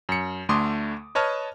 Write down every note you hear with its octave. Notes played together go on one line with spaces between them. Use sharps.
F#2 C#7
D2 D3 A3 C6 D6 D#6
B4 C#5 D#5 A5 F6